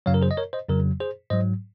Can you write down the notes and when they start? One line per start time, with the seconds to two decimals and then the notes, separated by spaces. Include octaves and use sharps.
0.06 F#2 C#3 F#3 C#5 F5
0.14 A#4
0.22 G#4 C5
0.31 D#5
0.37 A#4 C#5
0.53 C5 D#5
0.69 F2 C#3 F#3 A#4
1.00 G#4 C5
1.30 G#2 F#3 C5 D#5